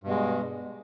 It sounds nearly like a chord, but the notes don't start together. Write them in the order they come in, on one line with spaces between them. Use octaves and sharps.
G2 B2 G#3